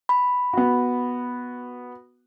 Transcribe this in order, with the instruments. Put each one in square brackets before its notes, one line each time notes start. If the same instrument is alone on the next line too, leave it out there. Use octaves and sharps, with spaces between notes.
[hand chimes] B5
[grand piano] B3 F#4